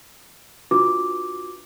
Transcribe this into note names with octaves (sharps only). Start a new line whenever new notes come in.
D4 F4 F#4 B4 D6